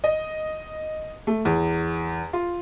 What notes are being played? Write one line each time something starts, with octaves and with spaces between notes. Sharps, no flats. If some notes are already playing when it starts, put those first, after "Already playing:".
D#5
A3
E2
F4